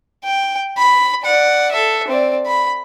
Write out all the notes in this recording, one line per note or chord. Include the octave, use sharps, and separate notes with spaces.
G5
B5
D5 F#5
A4 E5
C4 D5
B5